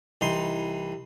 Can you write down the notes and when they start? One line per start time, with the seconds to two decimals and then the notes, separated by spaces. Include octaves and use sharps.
0.21 C2 E3 D#4 C6